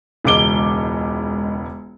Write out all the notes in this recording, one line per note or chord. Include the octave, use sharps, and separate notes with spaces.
E1 C#2 G#3 D6 D7 G7